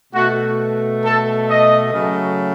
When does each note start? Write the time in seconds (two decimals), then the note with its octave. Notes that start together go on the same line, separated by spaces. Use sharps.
0.13 B2 A3 F#4
1.03 A4
1.48 D#5
1.93 C#3 F#3 A3